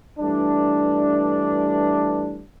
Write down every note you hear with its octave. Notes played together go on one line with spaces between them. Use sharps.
G2 E3 A3 D4